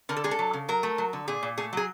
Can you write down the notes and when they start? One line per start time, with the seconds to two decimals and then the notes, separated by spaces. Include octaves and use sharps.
0.09 D3 A#4
0.17 A4
0.24 G#3 G#4
0.31 A4
0.39 F#3
0.53 C#3
0.68 F#3 A#4
0.83 A3
0.98 F#3
1.13 D3
1.28 A#2 G#4
1.43 A#2
1.58 A3 G#4
1.73 F#3 G#4